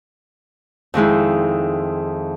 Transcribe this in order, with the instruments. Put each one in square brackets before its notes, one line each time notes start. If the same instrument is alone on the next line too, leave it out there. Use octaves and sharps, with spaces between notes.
[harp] F2 D#3 G#3 E4